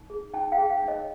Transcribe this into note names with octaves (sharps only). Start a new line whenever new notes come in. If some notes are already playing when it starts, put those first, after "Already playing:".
Already playing: D#4
G#4
D#4 G5 A5
F5 G5
G#4
F5 G5
D#4
C#5 D#5